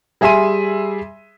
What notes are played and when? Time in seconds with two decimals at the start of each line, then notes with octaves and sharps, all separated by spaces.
0.21 G3 G#4 E5 G#5 C6 D#7